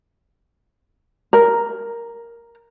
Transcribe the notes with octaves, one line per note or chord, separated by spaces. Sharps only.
A#4